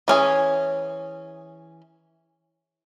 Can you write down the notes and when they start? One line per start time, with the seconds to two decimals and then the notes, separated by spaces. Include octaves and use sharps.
0.08 E3 C#4 G#4